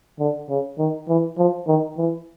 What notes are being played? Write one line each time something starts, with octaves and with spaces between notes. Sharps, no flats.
D3
C#3
D#3
E3
F3
D#3
E3